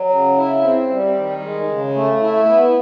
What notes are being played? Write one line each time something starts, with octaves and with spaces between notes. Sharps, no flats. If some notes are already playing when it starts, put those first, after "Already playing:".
Already playing: F#3
C#3
E4
C4
G3
D#3
G#3
C#3
A3
E4
B3